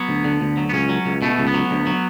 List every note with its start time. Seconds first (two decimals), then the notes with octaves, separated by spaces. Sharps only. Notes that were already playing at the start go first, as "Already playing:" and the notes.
Already playing: F#3 B3
0.09 D2
0.24 D3
0.41 D2
0.57 F#3
0.69 B3
0.74 C#2 C#4
0.89 F#3
1.06 C#2
1.22 B2 A3
1.38 C#2
1.47 B3
1.54 F#3
1.71 D2
1.87 F#3